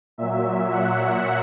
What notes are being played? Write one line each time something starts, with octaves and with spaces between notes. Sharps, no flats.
A#2 F#3 E5
F#5